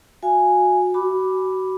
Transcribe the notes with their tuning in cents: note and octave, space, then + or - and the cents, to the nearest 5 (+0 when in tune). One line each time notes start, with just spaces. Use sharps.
F#4 -25 F5 -25 G#5 +0
F#4 +25 B5 +0 D6 +0